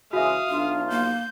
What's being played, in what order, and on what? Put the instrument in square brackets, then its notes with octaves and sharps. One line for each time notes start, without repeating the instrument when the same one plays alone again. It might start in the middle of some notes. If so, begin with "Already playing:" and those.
[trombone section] C#3 E3 G#3 [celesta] F#4 E5 [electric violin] F5 D#6
[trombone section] B1 F4 [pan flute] D4
[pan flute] A#3 [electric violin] G6